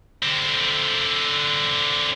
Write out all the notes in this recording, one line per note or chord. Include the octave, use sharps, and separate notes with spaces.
D3 C4